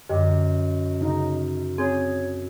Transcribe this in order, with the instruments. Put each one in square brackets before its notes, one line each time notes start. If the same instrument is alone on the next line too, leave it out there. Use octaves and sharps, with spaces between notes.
[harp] F#2 [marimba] D3 [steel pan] G4 [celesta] D#5
[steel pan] C#3 D#4
[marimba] C4 [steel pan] G#4 [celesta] C#5 G#6